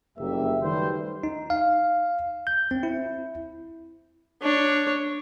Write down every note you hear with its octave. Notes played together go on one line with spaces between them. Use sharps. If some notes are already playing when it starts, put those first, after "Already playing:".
F#1 F2 G3 A#3 G4 E5
D#3 F#3 G3 A3 B4 C5
D#4
F5
G6
C4
E4
D4 C#5